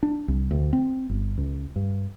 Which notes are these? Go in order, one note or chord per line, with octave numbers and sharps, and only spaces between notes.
D4
C2
D2
C4
G1
C#2
G2